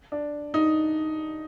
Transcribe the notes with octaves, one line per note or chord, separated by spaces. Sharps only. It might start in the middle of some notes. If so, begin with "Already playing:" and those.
D4
D#4